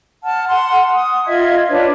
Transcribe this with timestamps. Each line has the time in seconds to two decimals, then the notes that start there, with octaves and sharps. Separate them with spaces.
0.24 F#5 A5 F6
0.48 F#5 C6
0.94 D#6
1.26 F4 D#5 E5 G#6
1.69 D4 F4 B4 C#5